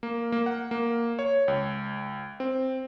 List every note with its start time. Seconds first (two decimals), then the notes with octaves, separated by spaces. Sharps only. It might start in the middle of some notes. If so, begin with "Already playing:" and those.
0.03 A#3
0.32 A#3
0.46 F#5
0.71 A#3
1.19 C#5
1.48 C#2
2.40 C4